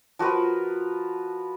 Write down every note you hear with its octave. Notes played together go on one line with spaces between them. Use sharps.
F3 F#4 A#4 B4